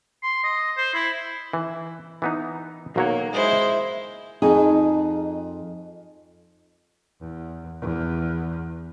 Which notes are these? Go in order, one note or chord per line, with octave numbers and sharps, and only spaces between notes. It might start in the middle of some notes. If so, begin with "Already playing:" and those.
C6
D#5
C5
E4
E3
E3 B3 D#4
B1 F#3 A#3 C#5
G#3 E4 C5
F2 D#4 G#4
E2
E2